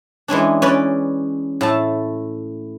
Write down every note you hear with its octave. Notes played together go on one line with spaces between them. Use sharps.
E3 G#3 C#4 D4
C#4 B4 D5
A2 A3 A5